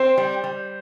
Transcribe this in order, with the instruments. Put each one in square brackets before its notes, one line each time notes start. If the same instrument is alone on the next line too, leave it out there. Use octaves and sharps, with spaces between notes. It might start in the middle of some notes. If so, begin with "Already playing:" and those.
Already playing: [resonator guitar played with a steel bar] C4 [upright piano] C5
[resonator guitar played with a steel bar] G3
G3